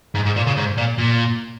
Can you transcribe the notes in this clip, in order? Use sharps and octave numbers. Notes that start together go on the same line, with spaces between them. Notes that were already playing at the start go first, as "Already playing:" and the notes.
G#2
G#2
A#2
C#3
G#2
A#2
A#2